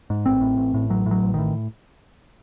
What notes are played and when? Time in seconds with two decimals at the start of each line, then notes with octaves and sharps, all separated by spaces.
0.10 G#2
0.26 A1 C4
0.41 A2
0.58 A1
0.74 A2
0.90 A1 F#3
1.06 A2
1.11 F#3
1.23 A1
1.34 A2 D#3